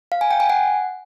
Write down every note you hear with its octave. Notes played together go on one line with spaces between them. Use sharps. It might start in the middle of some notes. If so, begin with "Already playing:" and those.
F5
G#5
G5
G#5
F#5